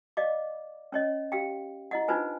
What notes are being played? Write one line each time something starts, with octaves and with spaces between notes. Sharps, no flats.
D5 D#5 F5 D6
C#4 C#5 D#5
G4 F5 G5
E4 D#5 F#5
D4 D#4 F4 B4 C5 G#5